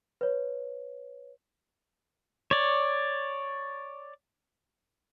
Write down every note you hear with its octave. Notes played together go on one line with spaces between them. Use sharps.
B4 C#5
C#5 D5